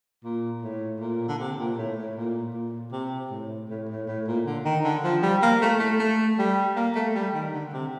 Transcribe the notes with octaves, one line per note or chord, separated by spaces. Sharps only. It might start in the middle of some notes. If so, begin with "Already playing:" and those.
A#2
A2
A#2
D3
C3
A#2
A2
A2
A#2
A#2
C3
A2
A2
A2
A2
A#2
D3
D#3
D3
F3
G3
A#3
A3
A3
A3
G3
A#3
A3
G3
D#3
D3
C3